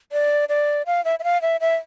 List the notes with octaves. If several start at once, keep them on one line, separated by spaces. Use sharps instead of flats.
D5
D5
F5
E5
E5
F5
E5
E5